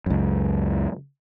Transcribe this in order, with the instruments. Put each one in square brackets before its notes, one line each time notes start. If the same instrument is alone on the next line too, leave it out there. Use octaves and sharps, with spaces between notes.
[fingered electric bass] C#2 F#2